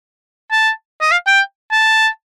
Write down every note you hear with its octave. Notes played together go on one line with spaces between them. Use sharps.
A5
D#5
F5
G5
A5